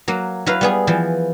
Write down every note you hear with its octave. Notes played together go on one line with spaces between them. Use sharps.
F#3 A#3
F#3 E4 B4 F5
G3 B3 G#4
E3 F3